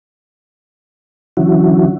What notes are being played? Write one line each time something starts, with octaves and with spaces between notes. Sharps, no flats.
D3 E3 F#3 C#4 E4 F#4